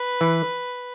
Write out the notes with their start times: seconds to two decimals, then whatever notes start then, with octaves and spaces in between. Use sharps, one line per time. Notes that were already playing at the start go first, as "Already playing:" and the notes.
Already playing: B4
0.21 E3